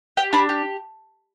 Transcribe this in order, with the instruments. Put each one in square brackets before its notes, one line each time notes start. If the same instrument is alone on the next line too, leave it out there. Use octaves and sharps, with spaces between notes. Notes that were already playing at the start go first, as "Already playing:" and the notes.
[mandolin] G4 G5
D4 B5
G4